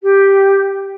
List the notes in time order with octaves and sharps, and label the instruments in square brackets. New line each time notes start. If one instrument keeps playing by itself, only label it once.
[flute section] G4